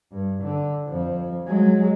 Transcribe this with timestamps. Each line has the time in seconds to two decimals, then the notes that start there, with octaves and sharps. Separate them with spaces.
0.11 G2
0.42 D3
0.88 F2 F3
1.47 F#3 G#3